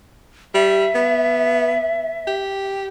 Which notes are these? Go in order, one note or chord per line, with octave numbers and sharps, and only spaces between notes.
G3 E5
B3
G4